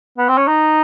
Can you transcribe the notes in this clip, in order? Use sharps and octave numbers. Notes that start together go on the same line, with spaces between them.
B3
C4
C#4
D#4